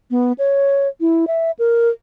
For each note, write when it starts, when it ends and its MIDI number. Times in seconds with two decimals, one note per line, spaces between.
0.11 0.32 59
0.38 0.88 73
1.01 1.25 64
1.27 1.51 76
1.59 1.89 70